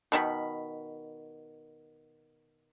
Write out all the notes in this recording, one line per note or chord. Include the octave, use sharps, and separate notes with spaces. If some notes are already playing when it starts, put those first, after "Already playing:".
B2 D#3 E4 B5